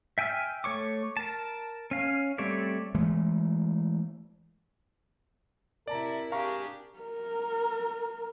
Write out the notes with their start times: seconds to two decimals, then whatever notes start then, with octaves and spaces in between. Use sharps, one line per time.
0.18 E5 G5 G#5 E6 F6
0.64 A3 C#5 C#6 D6
1.17 A#4 A5
1.91 C#4 F5
2.38 G3 A3 C4 C#5 D5
2.95 E3 G#3 A3
5.88 C3 E4 A#4 D5 A5 A#5
6.32 D4 G4 G#4 F5 A#5 C#6
6.99 A#4